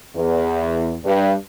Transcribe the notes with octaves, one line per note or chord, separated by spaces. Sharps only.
E2
G2